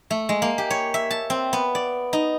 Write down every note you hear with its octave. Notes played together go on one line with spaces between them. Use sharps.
A3
G#3
A#3
G4
C#5
E5
A5
C4
B3
D5
D#4